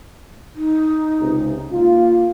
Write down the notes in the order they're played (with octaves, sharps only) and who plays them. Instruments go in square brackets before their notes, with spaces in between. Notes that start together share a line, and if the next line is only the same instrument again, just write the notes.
[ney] D#4
[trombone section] C#2 C3
[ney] A#3 [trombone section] F4